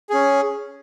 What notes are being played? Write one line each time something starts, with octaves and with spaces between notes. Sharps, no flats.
C#4 G#4